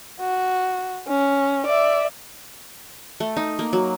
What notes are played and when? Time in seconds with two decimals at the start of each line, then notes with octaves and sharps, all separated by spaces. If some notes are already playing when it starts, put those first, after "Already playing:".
0.20 F#4
1.07 C#4
1.66 D5 E5
3.20 A3
3.37 D#4
3.59 A#3
3.73 F#3